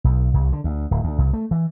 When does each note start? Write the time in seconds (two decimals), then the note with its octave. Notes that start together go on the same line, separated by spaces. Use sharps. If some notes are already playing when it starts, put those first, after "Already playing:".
0.04 B1
0.34 C2
0.53 D3
0.64 D2
0.91 D1
1.04 D2
1.18 C2
1.33 A3
1.51 E3